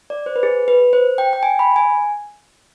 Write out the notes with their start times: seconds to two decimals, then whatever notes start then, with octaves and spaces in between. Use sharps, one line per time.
0.10 D5
0.26 C5
0.36 B4
0.43 G#4
0.68 B4
0.93 C5
1.18 G5
1.33 G5
1.43 G#5
1.59 B5
1.76 G#5